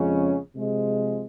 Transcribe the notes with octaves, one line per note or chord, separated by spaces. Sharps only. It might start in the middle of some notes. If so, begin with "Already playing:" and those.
Already playing: F2 C#3 G#3 C#4
C3 F3 G#3